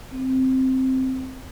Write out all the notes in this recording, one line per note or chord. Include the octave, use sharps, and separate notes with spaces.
C4